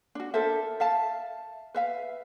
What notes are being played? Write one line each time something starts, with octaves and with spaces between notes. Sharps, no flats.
D4 F#4
A4 A#4 C5 E5
E5 F5 A5
B4 E5 F5